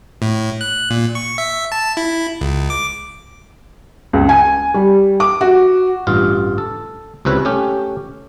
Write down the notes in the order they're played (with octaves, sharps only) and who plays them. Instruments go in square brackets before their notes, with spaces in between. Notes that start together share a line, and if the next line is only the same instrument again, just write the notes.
[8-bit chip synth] A2
F#6
A#2
C#6
E5
A5
E4
C#2
D6
[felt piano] C#2
G#5
G3
D6
F#4
[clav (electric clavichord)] A1 G2 F4
A4
C#2 C3 E4 B4 C#5
A3 C#4 G4